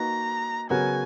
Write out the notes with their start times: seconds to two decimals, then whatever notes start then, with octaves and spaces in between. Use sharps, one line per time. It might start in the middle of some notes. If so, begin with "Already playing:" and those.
Already playing: A#3 D#4 F#4 B4 A#5
0.70 C#3 F#3 B3 F#4 A#4 G#5